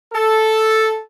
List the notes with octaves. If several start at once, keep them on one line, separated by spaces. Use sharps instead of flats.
A4